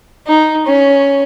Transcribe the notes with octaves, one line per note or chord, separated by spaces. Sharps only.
D#4
C#4